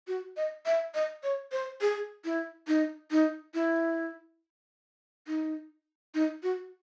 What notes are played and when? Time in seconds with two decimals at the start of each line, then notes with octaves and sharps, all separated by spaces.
0.08 F#4
0.37 D#5
0.66 E5
0.95 D#5
1.23 C#5
1.52 C5
1.81 G#4
2.25 E4
2.68 D#4
3.11 D#4
3.54 E4
5.27 D#4
6.14 D#4
6.43 F#4